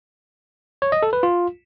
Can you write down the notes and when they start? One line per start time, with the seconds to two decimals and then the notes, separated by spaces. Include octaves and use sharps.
0.82 C#5
0.92 D#5
1.03 A4
1.13 B4
1.23 F4